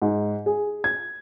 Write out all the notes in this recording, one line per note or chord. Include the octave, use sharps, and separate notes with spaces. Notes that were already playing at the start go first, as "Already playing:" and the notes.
G#2
G#4
G#6